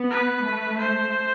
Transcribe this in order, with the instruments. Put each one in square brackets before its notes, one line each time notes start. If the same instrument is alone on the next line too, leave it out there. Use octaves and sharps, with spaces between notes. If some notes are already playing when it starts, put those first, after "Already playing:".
Already playing: [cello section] B3
[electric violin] B4
[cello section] A3
[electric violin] C5